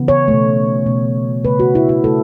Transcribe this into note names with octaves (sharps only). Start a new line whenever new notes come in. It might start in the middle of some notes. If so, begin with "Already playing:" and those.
Already playing: C#3 E3 B3
C#5
B2 A3
B2 A3
C#3 A3 B4
F#4
E4
F#4
C#3 A3 A4